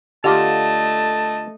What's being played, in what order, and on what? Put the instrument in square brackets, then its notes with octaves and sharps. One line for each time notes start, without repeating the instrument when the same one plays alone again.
[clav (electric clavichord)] D3 F4 F5 [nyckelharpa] A3 D#5 [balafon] G4 D6 [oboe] A5